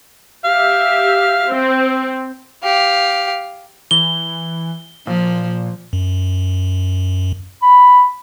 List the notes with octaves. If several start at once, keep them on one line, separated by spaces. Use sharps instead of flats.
G4 E5 F5
C4
G4 F5
E3 G7
A#2 F3
F#2
B5